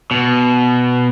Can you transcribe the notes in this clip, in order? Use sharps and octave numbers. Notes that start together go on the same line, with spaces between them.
B2